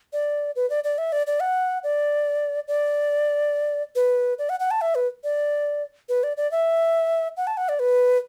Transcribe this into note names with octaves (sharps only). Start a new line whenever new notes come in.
D5
B4
D5
D5
E5
D5
D5
F#5
D5
D5
B4
D5
F#5
F#5
A5
E5
B4
D5
B4
D5
D5
E5
F#5
A5
F#5
D5
B4